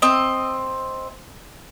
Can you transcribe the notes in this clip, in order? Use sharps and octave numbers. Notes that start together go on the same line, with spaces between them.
C4 D#5